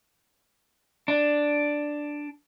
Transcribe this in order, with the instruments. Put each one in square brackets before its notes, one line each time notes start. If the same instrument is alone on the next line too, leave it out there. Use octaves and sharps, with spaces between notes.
[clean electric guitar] D4